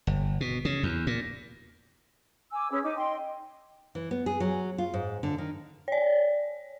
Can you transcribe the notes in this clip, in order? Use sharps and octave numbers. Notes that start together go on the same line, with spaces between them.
G1
B2
C#3
E2
A#2
G#5 D6 E6
C#4 G#4 B4 E6
D#4 D6
D#5 G5 C6
E3
B3
G#4
F#3
F4
G#2
D3
D#3
C#5 D5